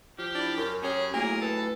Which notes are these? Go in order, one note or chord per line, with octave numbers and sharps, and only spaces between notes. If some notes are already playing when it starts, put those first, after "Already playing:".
F3 G4
D4 E4
F#2 A#4
C#4 G4 G#4 C#5
A2 F#3 A#3 F4 G#4 A#4
A4 B4